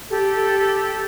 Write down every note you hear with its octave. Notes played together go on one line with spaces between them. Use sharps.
G4 A4